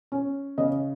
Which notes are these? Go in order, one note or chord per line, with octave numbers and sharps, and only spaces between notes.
C#4
C#3 D#5